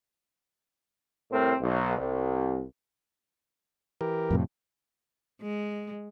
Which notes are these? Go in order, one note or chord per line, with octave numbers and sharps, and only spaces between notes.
C2 A2 C4 A#4
B1
C2
E3 G4 A#4
F2 A2 C3
G#3